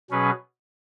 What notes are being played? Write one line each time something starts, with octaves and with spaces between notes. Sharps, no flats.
B2 F#3 C#4 G#4 B4